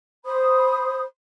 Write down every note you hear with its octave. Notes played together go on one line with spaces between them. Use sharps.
C5 B5 D#6